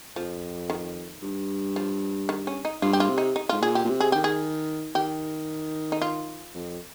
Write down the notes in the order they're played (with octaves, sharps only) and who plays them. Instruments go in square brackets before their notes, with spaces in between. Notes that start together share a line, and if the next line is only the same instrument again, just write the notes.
[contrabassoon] F2 [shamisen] F3
[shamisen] D#3
[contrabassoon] G2
[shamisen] F3
D#3
C#4
D#4
[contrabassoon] G2 [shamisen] F4
[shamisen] G4
F4
[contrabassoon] C3
[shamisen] D#4
D#4
[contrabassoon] G#2 [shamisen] F4
[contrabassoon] A#2 [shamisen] G#4
[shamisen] G4
[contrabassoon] A#2
C3
[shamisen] G#4
[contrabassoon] D#3 [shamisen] G4
[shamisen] G#4
[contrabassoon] D#3 [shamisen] G4
[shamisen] D#4
F4
[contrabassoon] F2